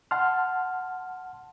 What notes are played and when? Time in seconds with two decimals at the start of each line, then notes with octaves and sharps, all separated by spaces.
0.11 F#5 A5 C6 F6